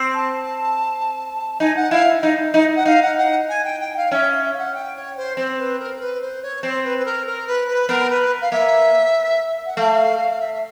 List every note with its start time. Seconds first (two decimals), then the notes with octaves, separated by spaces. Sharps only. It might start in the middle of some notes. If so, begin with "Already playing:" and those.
Already playing: C4
0.14 A5
1.60 D#4 G#5
1.76 F#5
1.91 E4 F5
2.23 D#4
2.54 D#4
2.76 F#5
2.85 D#4 F5
3.02 F#5
3.18 F#5
3.48 G#5
3.64 G5
3.80 G5
3.96 F5
4.11 C#4 E5
4.43 E5
4.53 F5
4.58 F#5
4.74 G5
4.95 C#5
5.16 C5
5.37 C4 C5
5.58 B4
5.79 A#4
5.96 A#4
6.00 B4
6.21 C5
6.42 C#5
6.63 C4 C5
6.84 B4
6.98 B4
7.05 A#4
7.26 A#4
7.47 B4
7.67 B4
7.88 B3 A#4
8.09 B4
8.41 F5
8.51 A#3 E5
9.65 F#5
9.77 A3 F5
10.40 E5
10.54 E5